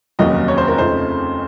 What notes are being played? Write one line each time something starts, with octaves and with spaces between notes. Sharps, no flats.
F1 D#2 C#3 F#3 A#3 D#5
C#5
C5
A#4
F2 C#3 A3 D#4 C5